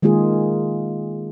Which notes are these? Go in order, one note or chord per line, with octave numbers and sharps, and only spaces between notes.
D#3 G#3 A#3 F4 G#4